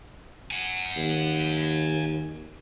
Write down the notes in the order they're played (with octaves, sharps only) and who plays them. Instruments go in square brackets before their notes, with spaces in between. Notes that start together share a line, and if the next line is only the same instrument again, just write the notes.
[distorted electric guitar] F#5 G#5
[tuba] D#2